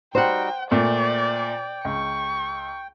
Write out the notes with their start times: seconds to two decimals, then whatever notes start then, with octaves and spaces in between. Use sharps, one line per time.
0.15 G3 D#4 F#4 C5 F#5 G5
0.71 A#2 A3 A4 D5 G5
1.85 C#2 C#6